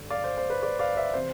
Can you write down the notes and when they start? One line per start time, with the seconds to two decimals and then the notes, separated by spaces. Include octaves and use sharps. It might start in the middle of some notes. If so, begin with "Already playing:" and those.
Already playing: G2 D3
0.10 D5 F5
0.24 C5
0.38 C5
0.50 B4
0.63 B4 D5
0.79 D5 F5
0.97 C5 E5
1.14 C3 E3 C5